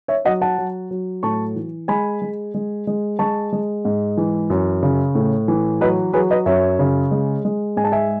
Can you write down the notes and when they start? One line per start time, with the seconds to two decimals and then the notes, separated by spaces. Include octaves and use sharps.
0.08 C#5 E5
0.25 F#3 D#5 F#5
0.41 F#5 A5
0.58 F#3
0.91 F#3
1.23 A2 A5 C#6
1.56 E3
1.88 G#3 G#5 B5
2.22 G#3
2.54 G#3
2.87 G#3
3.19 G#3 A5 C#6
3.53 G#3
3.85 G#2
4.17 E3
4.50 F#2
4.83 C#3
5.15 A2
5.48 E3
5.81 F#3 B4 D#5
6.13 F#3 G#4 B4
6.30 B4 D#5
6.46 F#2 C#5 E5
6.79 C#3
7.11 G#3
7.45 G#3
7.77 G#2 G#5
7.84 A5
7.92 E5 G#5